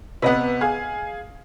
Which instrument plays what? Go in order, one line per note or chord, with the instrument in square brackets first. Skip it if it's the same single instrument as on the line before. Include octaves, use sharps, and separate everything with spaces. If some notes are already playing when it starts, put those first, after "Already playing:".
[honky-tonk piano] C3 B3 [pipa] B4 D#5 F#5
[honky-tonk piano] G#4 F5 G#5